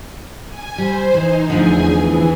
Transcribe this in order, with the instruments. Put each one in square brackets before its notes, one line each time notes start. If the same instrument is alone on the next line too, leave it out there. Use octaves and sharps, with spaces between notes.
[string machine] G#5
[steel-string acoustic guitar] G3 [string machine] C5
[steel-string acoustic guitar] E3 [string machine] D#4
[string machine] E2 G#4 G#5 [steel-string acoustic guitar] D3 F3 A3
[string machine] E3